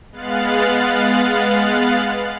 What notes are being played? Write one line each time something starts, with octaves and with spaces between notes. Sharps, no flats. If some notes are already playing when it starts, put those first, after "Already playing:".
G#3 B3 F5 F#6 A6